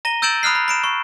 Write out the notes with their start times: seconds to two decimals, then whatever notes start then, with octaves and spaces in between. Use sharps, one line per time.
0.05 A#5 A#6 D#7 G7
0.22 E6 G6 A6 D7 E7 F#7
0.43 B5 D#6 F6 F#6 C7
0.55 B5
0.68 B5 D7 E7
0.84 C#6